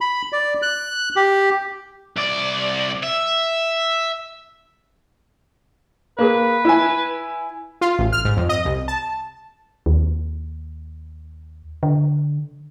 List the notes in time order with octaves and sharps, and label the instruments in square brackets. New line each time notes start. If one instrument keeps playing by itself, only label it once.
[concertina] B5
D5
F#6
G4
[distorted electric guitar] C2 D5
E5
[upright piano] A#3 G#4 [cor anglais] B4
[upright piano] E4 G#5
[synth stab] F4
A1
F6
G#2
F2
D#5
C2
A5
[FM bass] D#2
D3